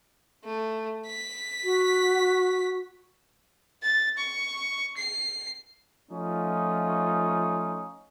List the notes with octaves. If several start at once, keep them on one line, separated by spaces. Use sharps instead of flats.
A3
B6
F#4
A6
C#6
C7
F3 A3 C#4 D#4 F4